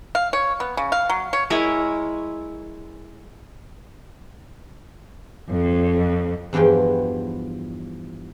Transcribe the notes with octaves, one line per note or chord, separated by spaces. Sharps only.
F5
C#5
B3
C#3
F5
F#3
C#5
G#3 E4 A#4 C#5
F2
E2 G2 E3 F3 G5